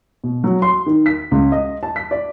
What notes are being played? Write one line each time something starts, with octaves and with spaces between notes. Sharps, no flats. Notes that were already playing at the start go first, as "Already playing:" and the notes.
B2
F#3
C6
D#3
B6
C#2
D#5
A5
B6
D5